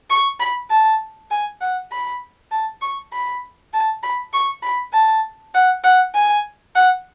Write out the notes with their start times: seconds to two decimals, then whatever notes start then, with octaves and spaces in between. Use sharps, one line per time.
0.10 C#6
0.40 B5
0.70 A5
1.31 G#5
1.61 F#5
1.91 B5
2.51 A5
2.81 C#6
3.12 B5
3.73 A5
4.03 B5
4.33 C#6
4.63 B5
4.93 A5
5.54 F#5
5.84 F#5
6.14 G#5
6.75 F#5